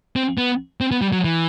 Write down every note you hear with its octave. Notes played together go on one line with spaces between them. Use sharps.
C4
B3
C4
B3
G3
F#3
E3